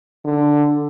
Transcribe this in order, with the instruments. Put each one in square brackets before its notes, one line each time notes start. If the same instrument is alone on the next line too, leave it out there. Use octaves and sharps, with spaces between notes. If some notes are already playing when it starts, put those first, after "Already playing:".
[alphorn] D3